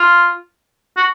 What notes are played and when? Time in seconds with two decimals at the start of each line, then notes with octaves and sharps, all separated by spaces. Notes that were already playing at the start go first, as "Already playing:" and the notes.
Already playing: F4
0.97 F#4